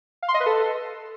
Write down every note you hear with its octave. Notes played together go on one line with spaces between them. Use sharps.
F5
C6
D#5
B4
A4